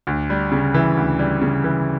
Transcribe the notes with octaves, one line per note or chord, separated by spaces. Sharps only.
D2
G3
C#3
E3
D2
G3
C#3
E3